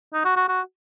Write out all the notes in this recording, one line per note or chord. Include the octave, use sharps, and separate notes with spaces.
D#4
F#4
F#4
F#4